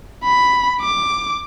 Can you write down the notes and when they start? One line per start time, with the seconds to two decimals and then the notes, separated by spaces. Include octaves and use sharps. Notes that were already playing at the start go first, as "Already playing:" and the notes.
0.24 B5
0.81 D6